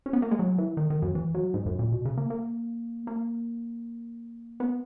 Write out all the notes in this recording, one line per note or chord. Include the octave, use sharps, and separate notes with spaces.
C#4
B3
A#3
G#3
F#3
E3
D#3
D#3
F#2
E3
F#3
G#2
F#2
A#2
B2
C#3
A#3
A#3
A#3
B3